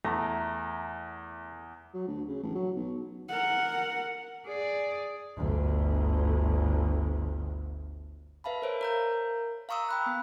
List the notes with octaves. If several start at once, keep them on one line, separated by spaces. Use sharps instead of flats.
E2 A3 A#5
F#3
D2
C#3
A1
F#3
B1
A#4 F#5
G#4 D5
G1 D2
B4 E5 F5 A5 B5
A#4 C5 C#5
A#4 A#5 G6
F5 A#5 C#6 D#6 E6
G5 B5 F#6
B3